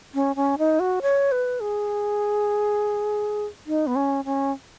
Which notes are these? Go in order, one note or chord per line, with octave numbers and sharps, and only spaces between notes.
C#4
C#4
D#4
F#4
C#5
B4
G#4
D#4
B3
C#4
C#4